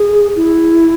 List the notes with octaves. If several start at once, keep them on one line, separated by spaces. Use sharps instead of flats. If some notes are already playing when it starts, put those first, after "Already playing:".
Already playing: G#4
E4